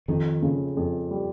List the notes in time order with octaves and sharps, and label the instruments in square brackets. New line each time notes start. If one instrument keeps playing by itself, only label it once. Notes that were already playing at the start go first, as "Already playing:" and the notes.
[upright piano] F2 [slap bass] D#3
[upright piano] C#3
F2
G3